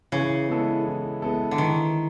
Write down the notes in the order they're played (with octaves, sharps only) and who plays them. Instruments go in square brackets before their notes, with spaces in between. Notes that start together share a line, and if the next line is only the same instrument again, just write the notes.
[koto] C#3 [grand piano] E3
[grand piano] G#3 B3 E4 A4
E3
G#3 B3 E4 A4
[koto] D3
[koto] D#3 [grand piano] E3